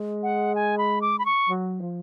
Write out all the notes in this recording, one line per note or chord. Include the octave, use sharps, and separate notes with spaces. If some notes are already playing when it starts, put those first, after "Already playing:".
Already playing: G#3
F#5
G#5
B5
D6
B5
C#6
F#3
F3